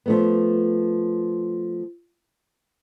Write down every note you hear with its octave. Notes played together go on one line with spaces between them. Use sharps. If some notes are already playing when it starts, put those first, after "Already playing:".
F3 A3 B3